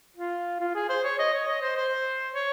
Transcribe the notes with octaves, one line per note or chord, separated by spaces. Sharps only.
F4
F4
G#4
C5
C#5
D#5
C#5
D#5
C5
C5
C#5